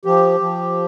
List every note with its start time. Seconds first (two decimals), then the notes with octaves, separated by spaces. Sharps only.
0.05 F3 G4
0.40 F3